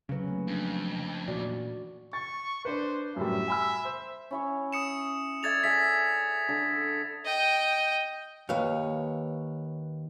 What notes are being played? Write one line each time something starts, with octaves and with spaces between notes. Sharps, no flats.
C#3 F#3 C#4 B4
D3 A3 A#3
F2 D4
A#2 E3 F#4 D5
C#6 A6
D4 B4 C5
F#2 A2 G3 E5
G#5 B5 E6
C5
C#4 E4 C#5
D#6 C#7 E7
A4 D5 E5 G#6 A6 F7
G#4 D5 E5 B6
D3 A4 A5
D#5 G5
D#2 B4 C#5 F5